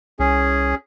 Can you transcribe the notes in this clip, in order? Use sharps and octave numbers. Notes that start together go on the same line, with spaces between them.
C2 C#4 G#4